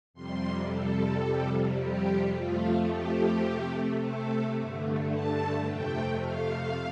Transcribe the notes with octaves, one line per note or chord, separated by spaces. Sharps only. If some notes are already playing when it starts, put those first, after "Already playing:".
F2 C3 G3 C6
A4
F2 C3 G3
G4
F2 F3 A3 F4
G4
C3 A3
A4
G2 D3 A3
A5
F2 C3 A3 G5
F5